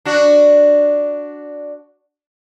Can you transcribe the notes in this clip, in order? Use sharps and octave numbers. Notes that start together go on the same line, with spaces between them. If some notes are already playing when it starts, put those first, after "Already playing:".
D4 F#4